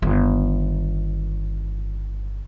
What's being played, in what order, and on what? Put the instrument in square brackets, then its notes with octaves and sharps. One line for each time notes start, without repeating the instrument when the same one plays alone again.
[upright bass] G1 D#3